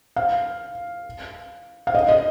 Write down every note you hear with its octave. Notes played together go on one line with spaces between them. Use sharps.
F5
F5
D#5
D#5